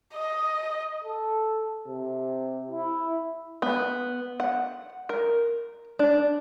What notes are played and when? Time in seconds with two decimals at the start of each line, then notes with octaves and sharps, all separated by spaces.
0.13 D#5
1.04 A4
1.88 C3
2.71 E4
3.62 B3
4.40 F#5
5.09 A#4
5.99 D4